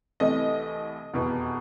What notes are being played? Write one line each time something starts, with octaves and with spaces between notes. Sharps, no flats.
C2 C3 E3 A3 D#5
F1 E2 B2